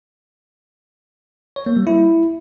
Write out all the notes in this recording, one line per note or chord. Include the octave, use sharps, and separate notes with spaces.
C#5
A#3
G3
E4